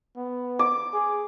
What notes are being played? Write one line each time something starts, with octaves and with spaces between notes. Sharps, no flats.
B3
D6
G#4